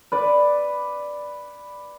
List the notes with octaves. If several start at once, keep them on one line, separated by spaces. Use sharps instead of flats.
B4 D5